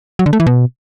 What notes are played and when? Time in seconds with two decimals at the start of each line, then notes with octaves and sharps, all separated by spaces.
0.19 F#3
0.26 D3
0.33 A3
0.40 E3
0.46 B2